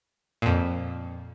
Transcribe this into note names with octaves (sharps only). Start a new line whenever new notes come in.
F2 A#2